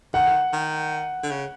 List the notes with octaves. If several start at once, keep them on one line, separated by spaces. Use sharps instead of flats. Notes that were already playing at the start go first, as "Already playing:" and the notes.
D#3 F#5
D#3
D3
C#3